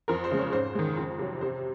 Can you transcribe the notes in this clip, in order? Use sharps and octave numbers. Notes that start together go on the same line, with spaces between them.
F2 A#4
C5
C#3 G#3
C#5
G#2 C5
D#3 G#3
F2
C3 F#3
C3 C5